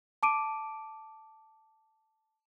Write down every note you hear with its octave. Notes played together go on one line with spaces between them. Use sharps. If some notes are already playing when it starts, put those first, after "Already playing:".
A5 D6 D7 D#7